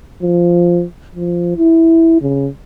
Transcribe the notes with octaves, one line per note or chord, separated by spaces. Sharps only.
F3
F3
E4
C#3